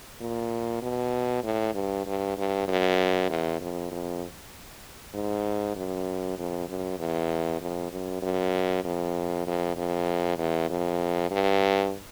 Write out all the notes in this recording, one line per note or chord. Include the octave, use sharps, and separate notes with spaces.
A#2
B2
A2
G2
G2
G2
F#2
E2
F2
F2
G#2
F#2
F2
F#2
E2
F2
F#2
F#2
F2
F2
F2
E2
F2
G2